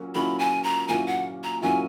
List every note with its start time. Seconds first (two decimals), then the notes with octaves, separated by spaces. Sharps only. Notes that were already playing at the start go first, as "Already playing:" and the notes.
Already playing: A#2 F#3 A#3 C#4
0.15 A#2 F#3 A#3 C#4 E4 B5
0.39 G#5
0.64 A#5
0.88 A#2 F#3 A#3 C#4 E4 G#5
1.07 F#5
1.43 A#5
1.62 A#2 F#3 A#3 C#4 E4 G#5